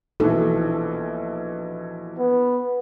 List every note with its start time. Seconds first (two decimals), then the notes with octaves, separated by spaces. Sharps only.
0.20 A#1 B2 E3 A4
2.19 B3